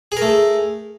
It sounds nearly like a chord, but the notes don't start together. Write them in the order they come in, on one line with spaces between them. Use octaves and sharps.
G#4 A#4 A3